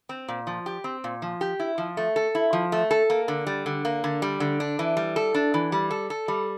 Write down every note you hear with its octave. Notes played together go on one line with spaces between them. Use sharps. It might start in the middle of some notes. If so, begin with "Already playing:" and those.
C4
A#2
F3
G4
C4
A#2
F3
G4
E4
F3
A3
A4
E4
F3
A3
A4
A#3
D3
G3
D3
A#3
D3
G3
D3
D4
E3
G3
A4
D4
E3
G3
A4
A4
G3